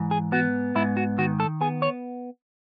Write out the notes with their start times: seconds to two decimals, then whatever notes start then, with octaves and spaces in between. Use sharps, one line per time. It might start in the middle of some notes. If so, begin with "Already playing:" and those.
Already playing: G#2 E3
0.11 G#4
0.32 B3 F#4
0.75 G#2 E4
0.97 F#4
1.18 D#3 F#4
1.40 A4
1.61 B3 G#4
1.82 C#5